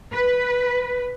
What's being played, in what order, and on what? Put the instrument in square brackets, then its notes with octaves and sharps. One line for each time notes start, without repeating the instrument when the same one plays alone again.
[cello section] B4